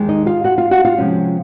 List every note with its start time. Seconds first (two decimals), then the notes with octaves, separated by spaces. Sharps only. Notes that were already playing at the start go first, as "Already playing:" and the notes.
Already playing: D#2 D#3 G#3
0.09 D#4 D#5
0.26 F4 F5
0.44 F#4 F#5
0.58 F4 F5
0.71 F#4 F#5
0.85 F4 F5
0.98 C3 F3 G#3 C#4